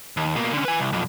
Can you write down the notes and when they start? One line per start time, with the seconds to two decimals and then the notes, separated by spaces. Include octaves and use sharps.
0.17 D#2
0.36 B2 A#3
0.53 D3 C#4
0.65 B4 G#5
0.79 C2
0.92 B1 F2